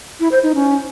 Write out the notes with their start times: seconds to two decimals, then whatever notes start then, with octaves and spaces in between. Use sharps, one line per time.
0.20 E4
0.32 C5
0.43 D#4
0.55 C#4